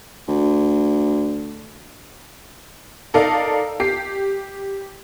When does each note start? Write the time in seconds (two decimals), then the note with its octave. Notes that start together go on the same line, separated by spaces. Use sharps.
0.28 D2
3.14 D#4 A4 A#4 D5 F5
3.80 G4 C7